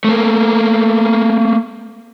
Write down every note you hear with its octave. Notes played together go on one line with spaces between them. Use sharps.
A3 A#3